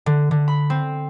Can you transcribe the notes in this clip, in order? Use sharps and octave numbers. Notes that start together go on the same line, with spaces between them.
D3
D3
B5
C4